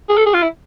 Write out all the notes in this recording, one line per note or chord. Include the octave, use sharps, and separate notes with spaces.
G#4
A4
G#4
F4
E4